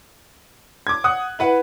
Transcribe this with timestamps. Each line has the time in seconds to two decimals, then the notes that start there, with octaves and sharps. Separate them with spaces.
0.87 D6 G#6
1.04 F#5 D#6 F#6
1.39 E4 B4 F#5